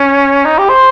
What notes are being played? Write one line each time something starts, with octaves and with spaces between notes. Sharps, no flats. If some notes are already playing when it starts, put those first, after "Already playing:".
Already playing: C#4
D#4
G4
C5